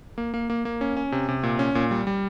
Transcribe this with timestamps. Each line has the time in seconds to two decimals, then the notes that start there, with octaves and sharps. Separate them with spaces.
0.18 A#3
0.34 A#3
0.50 A#3
0.65 A#3
0.81 C#4
0.97 C#4
1.12 C3
1.29 C3
1.43 A#2
1.59 C#4
1.75 A#2
1.91 G3
2.07 G3